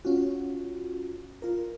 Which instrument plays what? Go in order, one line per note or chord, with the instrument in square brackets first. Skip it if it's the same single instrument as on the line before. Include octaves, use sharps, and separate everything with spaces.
[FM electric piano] C#4 F4 F#4
F4 A#4